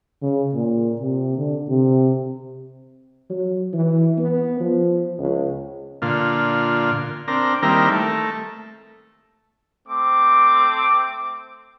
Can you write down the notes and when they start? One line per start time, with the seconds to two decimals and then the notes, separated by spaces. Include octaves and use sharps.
0.23 C#3
0.54 A#2
1.01 C3
1.37 D3
1.69 C3
3.30 F#3
3.74 E3
4.18 B3
4.60 F3
5.19 C#2
6.02 A#2 D3 F4
7.28 C4 D4 A#4
7.62 D#3 G3 A#3 C4 E4 A#4
7.91 A3
9.88 A3 C4 D6